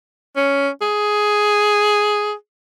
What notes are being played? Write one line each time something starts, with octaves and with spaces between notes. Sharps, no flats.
C#4
G#4